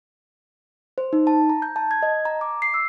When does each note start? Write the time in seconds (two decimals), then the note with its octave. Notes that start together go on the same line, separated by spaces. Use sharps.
0.98 C5
1.13 D#4
1.27 A5
1.49 A#5
1.62 G6
1.76 A5
1.91 G#6
2.03 D#5
2.25 A#5
2.41 D6
2.62 C7
2.74 E6